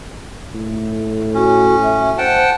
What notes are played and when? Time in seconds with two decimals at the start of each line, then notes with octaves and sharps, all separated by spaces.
0.55 A2
1.35 C#4 F#4
1.83 E5
2.18 C5 F#5 G5 A5